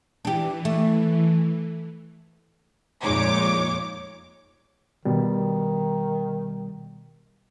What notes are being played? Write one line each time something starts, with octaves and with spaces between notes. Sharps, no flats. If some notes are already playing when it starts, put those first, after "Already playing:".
E3 D4 G4
A3
F2 A#2 G#3 D#4 C#5 D6
B2 D#3 G3